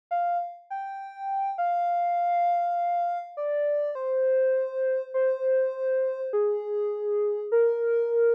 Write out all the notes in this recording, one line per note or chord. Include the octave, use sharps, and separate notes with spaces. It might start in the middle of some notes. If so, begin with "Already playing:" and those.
F5
G5
F5
D5
C5
C5
G#4
A#4